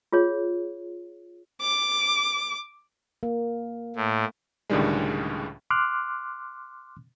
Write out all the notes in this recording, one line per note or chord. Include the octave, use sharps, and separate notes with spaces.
F4 G#4 C#5
D6
A#3
A2
C#2 A2 D3 D#3 G3 G#3
C6 D6 F6 F#6